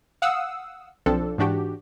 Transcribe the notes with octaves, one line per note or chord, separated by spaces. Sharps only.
F5 F#5 D#6 E6
B1 F3 C4 D4 A4
G#2 E3 D4 F#4 G4